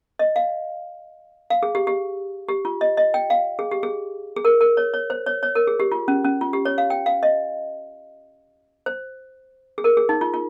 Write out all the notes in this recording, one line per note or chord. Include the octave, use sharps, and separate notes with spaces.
D#5
F5
F5
G#4
G4
G4
G4
F4
D#5
D#5
G5
F5
G#4
G4
G#4
G#4
A#4
A#4
C#5
C#5
C5
C#5
C#5
A#4
G#4
G4
F4
C#4
C#4
F4
G4
C#5
F5
G5
F5
D#5
C5
G#4
A#4
G#4
D#4
F4
F4